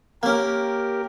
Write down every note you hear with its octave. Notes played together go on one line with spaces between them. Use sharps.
A#3 C#4 G4 A#4